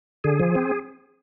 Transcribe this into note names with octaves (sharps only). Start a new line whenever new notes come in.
D3 G#4
F3
C4